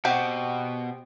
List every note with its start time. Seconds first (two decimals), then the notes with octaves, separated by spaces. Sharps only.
0.05 B2 C4 F#4 G4